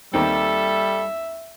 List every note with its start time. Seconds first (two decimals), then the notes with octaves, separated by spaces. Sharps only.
0.14 D#2 D#3 G3 C4 A4 E5